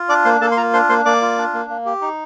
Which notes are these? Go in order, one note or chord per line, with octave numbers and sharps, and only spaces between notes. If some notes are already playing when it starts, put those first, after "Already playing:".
Already playing: F4
D4 D5 D6
A#3 C5 C6
A#3 A4 A5
C6
F4 A#4 A#5
D4 C5 C6
A#3 C5 C6
A#3 D5 D6
F4
D4
A#3
A#3
G4
D#4